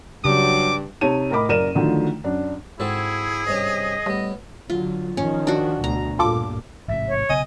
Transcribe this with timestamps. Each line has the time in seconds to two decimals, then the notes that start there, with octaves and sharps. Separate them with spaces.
0.25 G2 C#3 F#3 G3 D6
1.01 C3 D#4 C#5 A5 D#7
1.31 A2 A#4 D#5 B5 D6
1.49 F#1 F#2 A#4 D5 D#7 E7
1.75 D3 D#3 F3 F#3 A3
2.24 F#2 D4
2.80 G#2 C4 E4 F#4 G#4 A4
3.47 G2 C3 C#4 D#5
4.06 A2 G3 B3
4.70 D3 F#3 F4
5.17 D#3 F3 C#4
5.47 D4 F#4
5.84 D2 B2 A#5
6.19 G2 A#2 F4 A4 D6
6.88 A1 G#2 C3 E5
7.08 C#5
7.29 B1 C#3 B3 D#5 G#5